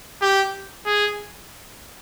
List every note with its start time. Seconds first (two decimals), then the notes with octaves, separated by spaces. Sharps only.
0.22 G4
0.86 G#4